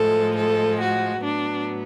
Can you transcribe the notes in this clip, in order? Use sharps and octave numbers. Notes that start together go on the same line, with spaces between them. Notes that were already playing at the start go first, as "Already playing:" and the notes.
Already playing: A2 F3 G#3 A4
A4
F#4
A2 F#3 B3 D4